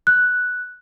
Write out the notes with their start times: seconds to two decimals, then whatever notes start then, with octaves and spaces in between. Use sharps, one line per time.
0.07 F#6